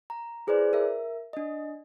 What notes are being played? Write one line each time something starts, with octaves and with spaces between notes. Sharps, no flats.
A#5
E4 G#4 B4 C5 D5
A#4 E5
D4 D#5